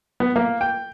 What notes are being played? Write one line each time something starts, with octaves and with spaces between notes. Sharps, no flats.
B3
A#3
G5